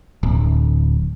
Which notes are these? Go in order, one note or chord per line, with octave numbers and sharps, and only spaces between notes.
D1